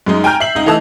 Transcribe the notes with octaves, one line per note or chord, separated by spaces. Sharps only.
F#2 G#3 D#4
G5 G#5 A#5 F6 G6
E5 C7 F#7
C#2 D#4
E3 A3 D#5 A5 E6